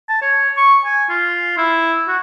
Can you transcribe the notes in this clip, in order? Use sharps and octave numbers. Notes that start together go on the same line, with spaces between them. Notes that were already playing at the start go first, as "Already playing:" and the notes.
A5
C#5
C#6
G#5
F4
E4
F#4